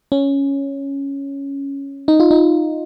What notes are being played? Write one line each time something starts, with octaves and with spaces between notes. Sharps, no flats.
C#4
D#4
F4
D#4